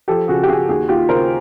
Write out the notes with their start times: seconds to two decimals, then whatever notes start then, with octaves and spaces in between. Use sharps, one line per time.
0.08 F3 G4 A4
0.28 C#3 F#4 G#4
0.43 G4
0.48 C#3 F#4 G#4
0.69 D#2 F#4 G#4
0.88 D#2 F4 G4
1.09 C#3 A#4 C5